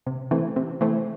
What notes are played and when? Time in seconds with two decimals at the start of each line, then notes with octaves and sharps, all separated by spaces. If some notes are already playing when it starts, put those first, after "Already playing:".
0.06 C3
0.31 E3 A3 C4
0.56 C3
0.81 E3 A3 C4